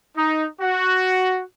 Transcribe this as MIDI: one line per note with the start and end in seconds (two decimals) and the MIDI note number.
0.16 0.45 63
0.60 1.41 66